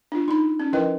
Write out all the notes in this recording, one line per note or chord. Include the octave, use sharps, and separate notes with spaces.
D4 F4
D#4 B5
C#4
F3 E4 A#4 B4 D#5 G5